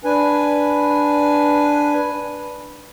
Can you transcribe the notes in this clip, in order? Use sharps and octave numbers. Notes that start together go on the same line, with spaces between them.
D4 B4 G#5